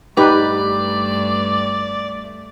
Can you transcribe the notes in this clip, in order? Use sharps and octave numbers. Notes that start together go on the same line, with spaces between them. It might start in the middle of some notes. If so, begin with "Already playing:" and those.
G2 A3 D#4 G4 B4 D5